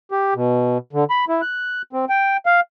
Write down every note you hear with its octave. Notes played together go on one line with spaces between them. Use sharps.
G4
B2
D3
B5
E4
F#6
C4
G5
F5